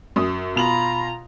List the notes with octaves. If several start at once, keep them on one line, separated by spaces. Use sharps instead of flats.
F#2 D#6
B2 F4 A#5 B5 F7 F#7